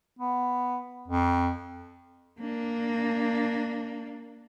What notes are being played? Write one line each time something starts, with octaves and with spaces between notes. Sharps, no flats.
B3
F2
A#3 D4